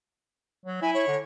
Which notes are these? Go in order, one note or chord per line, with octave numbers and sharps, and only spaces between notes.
F#3
E4 G#5
C#5
D3